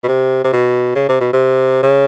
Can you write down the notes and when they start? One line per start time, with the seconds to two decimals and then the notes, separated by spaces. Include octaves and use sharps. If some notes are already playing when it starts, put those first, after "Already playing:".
0.04 B2
0.08 C3
0.44 C3
0.53 B2
0.95 C#3
1.09 C3
1.20 B2
1.33 C3
1.83 C#3